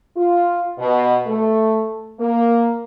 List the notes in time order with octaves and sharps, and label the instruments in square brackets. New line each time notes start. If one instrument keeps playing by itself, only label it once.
[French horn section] F4
B2
A3
A#3